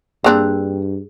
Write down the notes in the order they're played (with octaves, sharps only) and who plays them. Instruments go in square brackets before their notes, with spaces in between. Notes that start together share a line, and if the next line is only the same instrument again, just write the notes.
[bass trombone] G2 [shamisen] A#3 C4 D4 [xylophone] G#4 E6 F#6